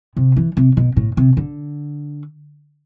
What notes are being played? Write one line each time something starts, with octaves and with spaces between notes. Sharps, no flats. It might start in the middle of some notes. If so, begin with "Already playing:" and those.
C3
E3
C3
B2
A2
C3
D3